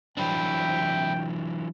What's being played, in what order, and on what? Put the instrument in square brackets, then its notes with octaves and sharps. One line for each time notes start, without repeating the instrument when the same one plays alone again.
[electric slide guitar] E3 F#3 D4 [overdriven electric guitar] C4 E4 [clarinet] G5